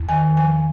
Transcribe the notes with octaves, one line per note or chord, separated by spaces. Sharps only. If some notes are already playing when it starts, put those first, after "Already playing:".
Already playing: E2
D#3 G#5
F3 G#5